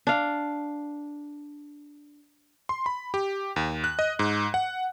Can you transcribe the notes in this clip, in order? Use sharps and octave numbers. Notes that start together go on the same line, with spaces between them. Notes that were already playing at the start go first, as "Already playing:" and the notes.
D4 F5
C6
B5
G4
D#2
F#6
D#5
G#2
F#5